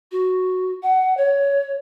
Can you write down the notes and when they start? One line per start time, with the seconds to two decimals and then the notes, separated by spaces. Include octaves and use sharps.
0.12 F#4
0.83 F#5
1.17 C#5